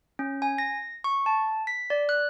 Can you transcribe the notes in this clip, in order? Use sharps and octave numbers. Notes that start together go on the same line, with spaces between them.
C#4
G#5
A#6
C#6
A5
B6
D5
F#6